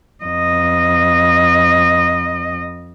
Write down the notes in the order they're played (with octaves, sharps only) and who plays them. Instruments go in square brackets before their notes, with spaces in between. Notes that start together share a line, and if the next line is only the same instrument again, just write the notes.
[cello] F2 D#5